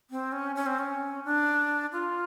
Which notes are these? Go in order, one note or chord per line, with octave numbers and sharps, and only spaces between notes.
C4
C#4
C#4
C4
C#4
D4
F4